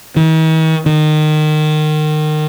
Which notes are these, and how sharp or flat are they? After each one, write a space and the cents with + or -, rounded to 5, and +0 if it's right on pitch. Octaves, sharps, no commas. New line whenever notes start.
D#3 +45
D#3 -25